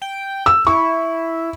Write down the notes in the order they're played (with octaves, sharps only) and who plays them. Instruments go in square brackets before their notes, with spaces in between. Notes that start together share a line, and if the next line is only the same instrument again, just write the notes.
[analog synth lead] G5
[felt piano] E6
[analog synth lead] E4 [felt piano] C#6